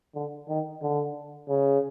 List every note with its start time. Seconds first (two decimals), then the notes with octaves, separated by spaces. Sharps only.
0.15 D3
0.49 D#3
0.82 D3
1.49 C#3